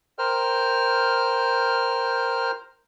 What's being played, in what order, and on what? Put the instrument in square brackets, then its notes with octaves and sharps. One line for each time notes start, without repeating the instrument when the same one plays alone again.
[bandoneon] A#4 C5 G5 F6